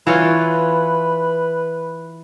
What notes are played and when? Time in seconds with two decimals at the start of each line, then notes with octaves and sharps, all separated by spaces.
0.07 E3 F4 B4 C#5